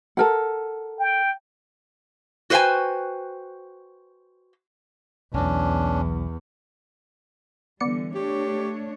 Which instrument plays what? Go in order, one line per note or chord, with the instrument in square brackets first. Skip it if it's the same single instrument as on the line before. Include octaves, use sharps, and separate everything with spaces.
[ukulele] A4 A#4 F#5
[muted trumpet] G5
[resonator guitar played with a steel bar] F#4 B4 C5 E5 G5 G#5
[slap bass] B1 E3 [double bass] E2 [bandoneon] C#4 D4
[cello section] D3 E3 G3 [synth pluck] B3 D5 C#7
[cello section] A3 D4 C#5 [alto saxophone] G4